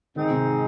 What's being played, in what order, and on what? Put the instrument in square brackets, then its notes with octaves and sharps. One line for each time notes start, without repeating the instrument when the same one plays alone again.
[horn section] G#2 G#3 C4 D#4 [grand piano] D#3
[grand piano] C3